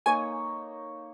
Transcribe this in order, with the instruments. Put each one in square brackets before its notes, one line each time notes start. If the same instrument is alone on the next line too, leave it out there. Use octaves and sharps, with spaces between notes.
[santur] A#3 D#4 C#5 [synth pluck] G#5